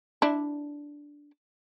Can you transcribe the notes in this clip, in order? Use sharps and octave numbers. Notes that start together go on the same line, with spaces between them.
D4 E4